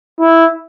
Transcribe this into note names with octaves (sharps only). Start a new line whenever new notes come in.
E4